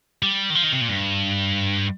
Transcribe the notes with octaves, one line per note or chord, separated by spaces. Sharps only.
G3
D#3
F3
D#3
C3
A#2
G2